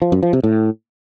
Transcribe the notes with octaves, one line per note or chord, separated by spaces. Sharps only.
F3
F#2
F3
C3
A2